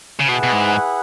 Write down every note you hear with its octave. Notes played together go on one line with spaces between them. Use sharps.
C#3
B2 E4 G#4 B4 F#5
B2
G#2